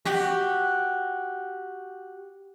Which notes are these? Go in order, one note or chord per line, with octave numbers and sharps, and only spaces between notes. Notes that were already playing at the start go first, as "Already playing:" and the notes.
F#4 G4